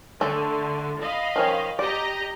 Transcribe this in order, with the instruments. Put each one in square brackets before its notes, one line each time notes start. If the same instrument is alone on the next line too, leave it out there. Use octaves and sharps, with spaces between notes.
[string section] D3 [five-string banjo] A3 A4
[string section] D#5 F5 B5
[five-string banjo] D#3 F3 C#4
[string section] G4 D#5 A#5 [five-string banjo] D5